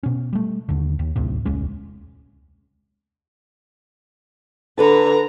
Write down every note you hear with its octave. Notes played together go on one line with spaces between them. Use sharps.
B2 C#4
G3 A3
D#2 D3
D#2
A1 D2 A2 C3
E1 C#2 G#3 C#4
D3 A4 B4 A5 A#5